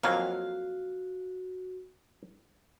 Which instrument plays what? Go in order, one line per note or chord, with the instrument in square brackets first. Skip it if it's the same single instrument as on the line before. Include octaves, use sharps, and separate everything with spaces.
[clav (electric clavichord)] F2 F#3 A#3 [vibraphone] F#4 [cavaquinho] F5